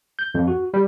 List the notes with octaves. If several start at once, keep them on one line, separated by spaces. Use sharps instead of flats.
G6
F2
F#4
G3